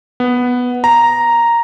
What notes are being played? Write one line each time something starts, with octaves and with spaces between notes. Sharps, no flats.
B3
A#5